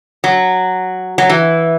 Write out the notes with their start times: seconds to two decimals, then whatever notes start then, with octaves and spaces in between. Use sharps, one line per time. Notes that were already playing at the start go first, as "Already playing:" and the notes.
0.24 F#3
1.18 F#3
1.29 E3